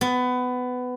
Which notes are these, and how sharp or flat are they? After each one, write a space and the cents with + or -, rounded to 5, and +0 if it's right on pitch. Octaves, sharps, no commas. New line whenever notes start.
B3 +20